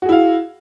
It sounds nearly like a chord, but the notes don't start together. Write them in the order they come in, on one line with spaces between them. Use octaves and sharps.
F#4 G#4 E4 F5